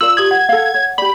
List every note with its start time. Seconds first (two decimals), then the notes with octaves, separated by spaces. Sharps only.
0.01 F4 A#4 D5 E6 F#7
0.17 G4 D#6 G#6 F#7
0.31 F#5
0.49 A4 F5
0.74 C#5
0.98 G4 D5 B5